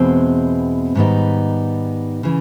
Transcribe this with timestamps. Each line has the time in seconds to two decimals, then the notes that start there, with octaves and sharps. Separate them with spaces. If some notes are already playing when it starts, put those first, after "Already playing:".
Already playing: E2 B2 G#3 C4
0.95 G#2 D#3 G3 B3 D#4
2.23 C#3 E3